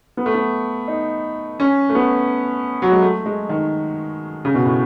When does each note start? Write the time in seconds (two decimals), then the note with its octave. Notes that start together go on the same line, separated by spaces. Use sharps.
0.17 B3
0.26 A3
0.34 B3
0.88 D#4
1.60 C#4
1.89 A3
1.95 B3
2.82 F#3
2.92 G#3
3.02 A3
3.26 G#3
3.49 D#3
4.45 C#3
4.54 B2
4.65 A2